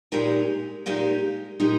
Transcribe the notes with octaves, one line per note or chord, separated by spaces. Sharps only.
A#2 G#3 D#4 G4 A#4
A#2 G#3 D#4 G4 A#4
A#2 G#3 D#4 G4 A#4